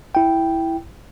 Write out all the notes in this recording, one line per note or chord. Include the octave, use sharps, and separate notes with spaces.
E4 G5